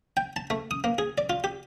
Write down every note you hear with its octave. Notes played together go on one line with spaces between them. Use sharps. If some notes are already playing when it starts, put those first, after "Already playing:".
G5
A5
A3
D#6
A#3
G#4
D5
F4
G4